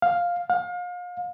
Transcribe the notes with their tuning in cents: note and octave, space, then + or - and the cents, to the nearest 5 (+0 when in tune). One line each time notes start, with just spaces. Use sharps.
F5 +5
F5 +35